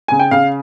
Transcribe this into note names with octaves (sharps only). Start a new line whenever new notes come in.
C#3 G#5
G5
C#3 F5